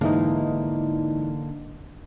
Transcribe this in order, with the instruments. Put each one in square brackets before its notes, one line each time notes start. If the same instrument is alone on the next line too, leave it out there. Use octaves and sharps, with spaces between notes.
[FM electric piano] G#2 E3 D#4 [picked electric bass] D3 A#3